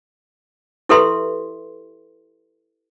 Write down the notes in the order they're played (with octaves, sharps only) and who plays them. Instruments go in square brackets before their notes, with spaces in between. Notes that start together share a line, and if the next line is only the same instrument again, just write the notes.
[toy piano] E4 G4 A4 B4 E5 C6